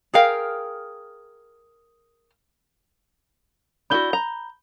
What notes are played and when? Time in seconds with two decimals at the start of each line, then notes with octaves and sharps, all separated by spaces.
0.14 G#4 A#4 F5 G5
3.90 D4 E4 F#4 B5 G6 G7
4.13 A#5